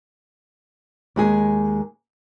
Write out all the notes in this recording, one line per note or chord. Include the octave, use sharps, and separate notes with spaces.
D#2 G#3 G#4